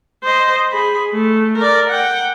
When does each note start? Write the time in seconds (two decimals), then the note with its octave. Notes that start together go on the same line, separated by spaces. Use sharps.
0.24 C5 D#5
0.72 G#4 B5
1.13 A3
1.58 A#4 D5
1.90 F#5 G5